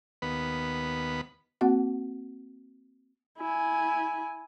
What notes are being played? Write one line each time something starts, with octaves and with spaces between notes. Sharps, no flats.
D#2 B3 B5
A#3 C4 F#4 F#5
E4 G#5